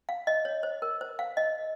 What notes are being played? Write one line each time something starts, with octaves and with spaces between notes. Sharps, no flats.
F5
D#5
C#5
C5
A#4
C5
F5
D#5